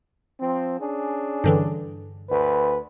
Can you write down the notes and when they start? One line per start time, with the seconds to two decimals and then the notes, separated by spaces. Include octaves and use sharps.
0.41 F3 C4
0.79 C#4 D4 G#4
1.44 G2 D3 E3
2.29 D2 B4